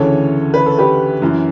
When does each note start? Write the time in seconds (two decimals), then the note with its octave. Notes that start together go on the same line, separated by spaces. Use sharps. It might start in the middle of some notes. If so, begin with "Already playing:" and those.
Already playing: D2 C#3 E3 A4 C#5
0.54 B4
0.66 A4
0.79 G4 B4
1.22 F#2 E3